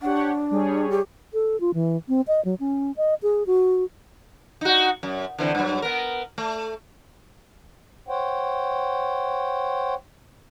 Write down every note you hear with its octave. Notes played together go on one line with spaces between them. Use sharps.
D4 G4 C#5 F#5
G3 G#4 C#5
G4
A4
F4
E3
C4
D#5
F#3
C#4
D#5
G#4
F#4
D#4 F#4
F#2
D3 E3 C4
G2 F#3
B3 A#4
A3
C5 C#5 F#5 G5